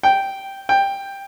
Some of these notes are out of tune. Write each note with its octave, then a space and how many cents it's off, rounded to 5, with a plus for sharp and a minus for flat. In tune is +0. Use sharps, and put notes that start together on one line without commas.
G5 -5
G5 +10